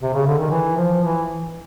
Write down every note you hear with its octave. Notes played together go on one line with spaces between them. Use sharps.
C3
C#3
D3
D#3
E3
F3
E3